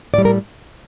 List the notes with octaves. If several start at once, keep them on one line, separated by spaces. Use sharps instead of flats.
A2 G3 D5
A#4